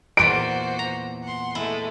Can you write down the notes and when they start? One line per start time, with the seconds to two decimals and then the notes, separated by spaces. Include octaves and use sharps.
0.17 E2 A#2 E3 F#4 C5 D7
0.79 A#5
1.22 F#5 C6
1.55 G#3 A3 E4